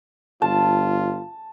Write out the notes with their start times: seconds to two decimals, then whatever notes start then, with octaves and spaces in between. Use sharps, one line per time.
0.42 G1 F4 A5